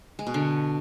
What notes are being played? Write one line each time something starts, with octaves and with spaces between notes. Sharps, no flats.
G#3
B2
D3